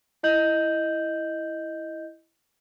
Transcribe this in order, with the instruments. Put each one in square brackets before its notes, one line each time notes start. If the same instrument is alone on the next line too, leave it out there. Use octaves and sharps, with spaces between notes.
[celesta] E4 D#5 G6 F#7